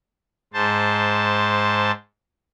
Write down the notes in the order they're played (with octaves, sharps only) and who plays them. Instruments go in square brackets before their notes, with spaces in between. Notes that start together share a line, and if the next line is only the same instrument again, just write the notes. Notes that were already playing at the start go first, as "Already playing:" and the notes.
[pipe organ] G#2 C5 A5